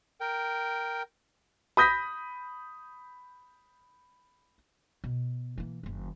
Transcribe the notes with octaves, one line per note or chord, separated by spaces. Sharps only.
A#4 G5
B5 D#6 G6 A#6 B6
B2
E3 A#3
F#1 D#3